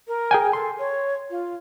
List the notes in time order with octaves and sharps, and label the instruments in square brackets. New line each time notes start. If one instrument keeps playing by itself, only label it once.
[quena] A#4
[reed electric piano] G#4 G5 G#5
[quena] A4 [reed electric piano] C6
[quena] C#5
F4